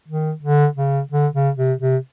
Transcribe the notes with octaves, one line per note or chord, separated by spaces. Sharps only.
D#3
D3
C#3
D3
C#3
C3
C3